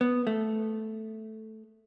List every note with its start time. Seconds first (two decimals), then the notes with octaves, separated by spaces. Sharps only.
0.01 B3
0.27 A3